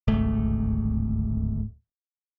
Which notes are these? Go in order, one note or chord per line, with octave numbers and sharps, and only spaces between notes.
D1 G#1 C#2 A3